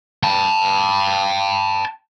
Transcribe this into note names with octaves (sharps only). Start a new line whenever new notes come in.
G5 A5